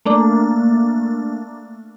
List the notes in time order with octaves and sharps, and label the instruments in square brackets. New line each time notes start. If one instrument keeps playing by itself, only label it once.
[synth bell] A3 A#3 D4